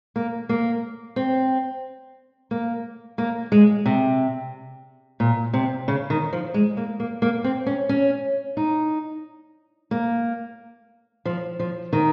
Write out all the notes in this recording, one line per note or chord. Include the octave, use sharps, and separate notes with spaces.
A#3
A#3
C4
A#3
A#3
G#3
C3
A#2
C3
C#3
D#3
F3
G#3
A#3
A#3
A#3
C4
C#4
C#4
D#4
A#3
F3
F3
D#3